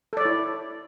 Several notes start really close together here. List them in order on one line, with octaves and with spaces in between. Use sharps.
A4 D5 C#5 E4